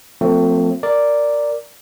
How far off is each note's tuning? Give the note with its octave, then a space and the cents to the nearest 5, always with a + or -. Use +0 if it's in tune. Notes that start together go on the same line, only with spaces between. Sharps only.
F3 +25 A3 +30 C4 -20
A#4 -5 D5 +0